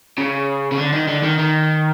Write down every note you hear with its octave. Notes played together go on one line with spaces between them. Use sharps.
C#3
C#3
D3
D#3
D3
D#3
D#3